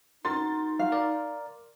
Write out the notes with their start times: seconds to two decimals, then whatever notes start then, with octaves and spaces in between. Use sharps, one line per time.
0.25 D#4 F#4 A#4 C6 A6
0.79 F#4 F5
0.92 A#4 D5